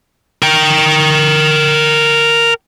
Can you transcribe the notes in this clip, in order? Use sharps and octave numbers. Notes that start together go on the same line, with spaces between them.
A#4 G5